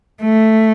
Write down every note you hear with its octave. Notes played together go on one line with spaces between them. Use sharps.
A3